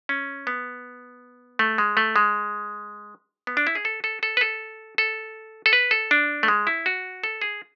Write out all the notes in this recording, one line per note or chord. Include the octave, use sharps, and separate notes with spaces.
C#4
B3
A3
G#3
A3
G#3
B3
D4
E4
G#4
A4
A4
A4
B4
A4
A4
A4
B4
A4
D4
A3
G#3
E4
F#4
A4
G#4